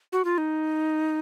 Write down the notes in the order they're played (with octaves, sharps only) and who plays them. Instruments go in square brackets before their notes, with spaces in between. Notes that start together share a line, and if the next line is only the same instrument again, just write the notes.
[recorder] F#4
F4
D#4